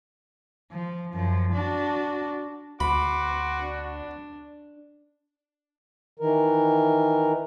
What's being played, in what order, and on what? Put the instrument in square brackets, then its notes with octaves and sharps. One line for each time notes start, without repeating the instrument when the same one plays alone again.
[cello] F3
F#2 F3
D4 F#4
[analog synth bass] D2 [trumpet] F#4 [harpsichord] B5 [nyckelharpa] C6 D6
[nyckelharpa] D4
[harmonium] D#3 E3 A#4